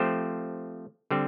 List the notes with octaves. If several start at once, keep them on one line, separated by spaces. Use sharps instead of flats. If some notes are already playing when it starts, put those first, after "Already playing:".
Already playing: F3 A3 C4 G4 C5
D3 G3 C4